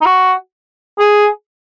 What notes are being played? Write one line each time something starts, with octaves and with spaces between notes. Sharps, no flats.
D#4
F#4
G#4